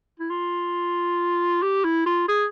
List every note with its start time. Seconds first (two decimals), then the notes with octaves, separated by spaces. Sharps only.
0.19 E4
0.30 F4
1.62 G4
1.84 E4
2.06 F4
2.28 G#4